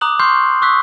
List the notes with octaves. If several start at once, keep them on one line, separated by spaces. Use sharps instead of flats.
A#5 D6 D#6 F#6 F#7
C6 C#6 F6 G6 C7
C#6 D#6 E6 F#6 B6